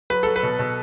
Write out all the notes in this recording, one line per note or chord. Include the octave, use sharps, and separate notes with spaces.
F#3 B4
F#3 A4
B4
B2
B2